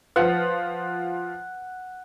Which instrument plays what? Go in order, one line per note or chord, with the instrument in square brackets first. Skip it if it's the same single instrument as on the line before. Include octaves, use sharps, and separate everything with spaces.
[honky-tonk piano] F3 F4 [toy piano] B4 [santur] F#5